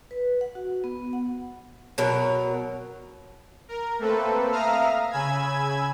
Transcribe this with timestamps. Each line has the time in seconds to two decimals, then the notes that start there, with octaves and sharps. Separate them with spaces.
0.11 B4
0.41 F#5
0.55 F#4
0.84 B3
1.13 F#5
1.98 B2 F#3 A#4
3.68 A#4
3.99 A3 A#3 C4 A4 B4
4.52 E5 F5 A#5 D#6 F6
5.11 C#3 G#5 B5 E6 G#6